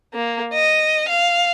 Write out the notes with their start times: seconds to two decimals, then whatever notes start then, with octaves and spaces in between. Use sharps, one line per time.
0.14 A#3
0.54 D#5
1.09 F5